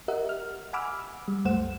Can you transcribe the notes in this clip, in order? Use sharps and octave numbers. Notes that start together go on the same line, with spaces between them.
G4 A#4 D#5 E5 F#5
F6
F#5 G#5 B5 D6 E6 F6
G3
C2 F#2 A3 C5 F#5 E7